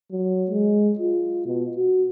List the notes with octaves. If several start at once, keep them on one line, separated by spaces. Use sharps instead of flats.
F#3
G#3
F4
B2
F#4